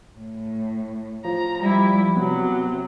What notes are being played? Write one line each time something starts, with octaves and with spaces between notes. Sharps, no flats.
A2
F3 A#5
G3 E4
C3 F#3 B3